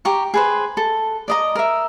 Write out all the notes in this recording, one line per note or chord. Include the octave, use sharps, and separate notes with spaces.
G4 A#5 C#6
G#4 B4 C5
A4
D5 D#5 A#5
A#4 E5